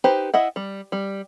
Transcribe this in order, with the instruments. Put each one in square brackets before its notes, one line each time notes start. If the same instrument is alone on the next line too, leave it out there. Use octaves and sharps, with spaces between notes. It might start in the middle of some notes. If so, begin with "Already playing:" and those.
[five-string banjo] D#4 G4 B4 C5
E4 D#5 E5 F#5
G3
G3